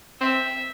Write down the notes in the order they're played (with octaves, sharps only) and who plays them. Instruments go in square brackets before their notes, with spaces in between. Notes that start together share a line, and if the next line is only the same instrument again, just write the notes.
[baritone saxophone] C4 [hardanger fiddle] E5